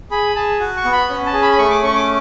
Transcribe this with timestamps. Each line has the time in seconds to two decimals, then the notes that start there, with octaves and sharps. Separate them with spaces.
0.11 G#4 B5
0.35 G#4 A5
0.60 F#4
0.76 C#6
0.85 B3
0.92 B5
1.10 C#4
1.26 A5
1.33 G#4
1.42 B5
1.53 B5
1.58 A3 C#6
1.70 D6
1.83 C#4 C#6
1.96 D6